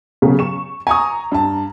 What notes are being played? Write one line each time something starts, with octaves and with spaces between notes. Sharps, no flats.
C#3 F#3 B3
C#6 E7
G#5 A#5 C#6 D#6
G2 A5